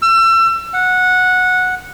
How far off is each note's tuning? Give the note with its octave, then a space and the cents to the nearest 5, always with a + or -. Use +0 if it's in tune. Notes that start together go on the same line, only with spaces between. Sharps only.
E6 +35
F#5 -15